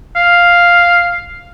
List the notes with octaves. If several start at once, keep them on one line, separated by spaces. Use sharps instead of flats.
F5